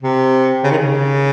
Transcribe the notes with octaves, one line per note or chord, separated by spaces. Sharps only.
C3
C#3
D#3
C#3